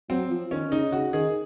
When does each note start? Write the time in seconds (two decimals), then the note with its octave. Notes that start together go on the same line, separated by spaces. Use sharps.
0.09 F#3 C4
0.30 F3
0.51 D#3 C#4
0.71 C#3 D#4
0.92 C#3 F#4
1.13 D#3 G#4